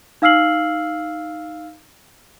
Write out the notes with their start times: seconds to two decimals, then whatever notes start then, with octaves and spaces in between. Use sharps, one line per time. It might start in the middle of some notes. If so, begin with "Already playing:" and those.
0.22 D#4 F5 E6 F6 C7 F#7